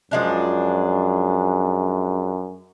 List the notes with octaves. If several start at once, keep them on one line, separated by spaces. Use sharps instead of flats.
F#2 F3 G#3 D4